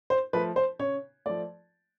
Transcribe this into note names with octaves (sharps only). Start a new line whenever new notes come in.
C5
F3 A3 B4
C5
C#3 C#5
F3 A3 D5